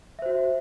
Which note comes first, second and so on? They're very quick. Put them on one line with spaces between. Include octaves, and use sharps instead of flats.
E5 C5 F#4